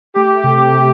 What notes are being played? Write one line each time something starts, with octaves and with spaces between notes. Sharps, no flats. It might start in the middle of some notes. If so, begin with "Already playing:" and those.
A3 G4
C3
C3